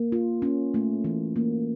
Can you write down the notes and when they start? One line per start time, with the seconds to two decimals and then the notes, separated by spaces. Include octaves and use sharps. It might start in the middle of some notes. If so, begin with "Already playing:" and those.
Already playing: A#3
0.12 F4
0.42 C#4
0.74 A3
1.04 E3
1.36 A#3